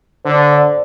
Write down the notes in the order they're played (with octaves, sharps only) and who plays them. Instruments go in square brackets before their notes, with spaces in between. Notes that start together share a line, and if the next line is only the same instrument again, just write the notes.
[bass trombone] D3 [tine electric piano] C5
[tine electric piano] D5